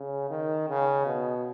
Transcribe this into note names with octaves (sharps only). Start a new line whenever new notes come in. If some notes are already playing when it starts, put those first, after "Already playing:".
Already playing: C#3
D#3
C#3
B2